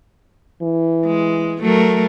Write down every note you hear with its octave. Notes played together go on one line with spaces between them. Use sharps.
E3
G#3
F#3 A3 A#4